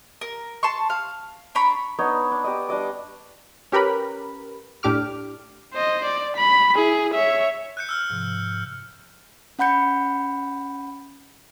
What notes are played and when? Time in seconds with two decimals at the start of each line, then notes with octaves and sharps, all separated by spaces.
0.21 A#4
0.63 A5 C6 C#6
0.90 F5
1.55 D4 A#5 B5 C#6
1.99 B3 D4 D#4 C#5
2.31 D4
2.44 G4 D5 D#5
2.68 G3 D4 D#5 D6
3.72 C#4 G4 A#4 B4 B5
4.83 A2 D4 G4 D6 F6
5.73 C5 D#5
6.05 D5
6.37 B5
6.75 E4 G#4
7.14 C#5 E5
7.77 F#6 G6 C#7
7.89 E6 F6
8.10 G#2 C3 F3
9.59 C#4 F#5 B5 G6 C#7